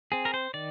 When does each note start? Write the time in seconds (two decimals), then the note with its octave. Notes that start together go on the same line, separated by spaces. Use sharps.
0.12 C4 G#4
0.25 A#4
0.34 C5
0.54 D#3 D5